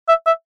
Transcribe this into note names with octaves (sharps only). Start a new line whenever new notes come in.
E5
E5